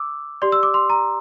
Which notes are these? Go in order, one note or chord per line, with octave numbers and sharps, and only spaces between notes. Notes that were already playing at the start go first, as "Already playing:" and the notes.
Already playing: D6 E6
G4 D5 C6
E6
D6
C6
A#5